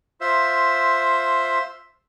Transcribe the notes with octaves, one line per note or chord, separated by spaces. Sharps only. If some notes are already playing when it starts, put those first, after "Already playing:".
F4 C5 E5